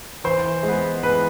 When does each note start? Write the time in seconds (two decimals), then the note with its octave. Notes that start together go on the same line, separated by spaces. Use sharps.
0.24 E3 C5
0.63 G#3
0.68 B3
1.03 E3 B4